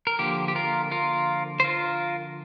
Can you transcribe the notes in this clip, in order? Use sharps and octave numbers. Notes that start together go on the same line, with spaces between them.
A#4
D3 F3 A#3 G4
G4
F4 A#4
F4 A#4
C5
F4 A#4